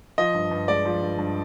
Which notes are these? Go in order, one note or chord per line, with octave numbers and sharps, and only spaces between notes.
F3 D#5
G2
G2
G#3 D5
F3
G2
G2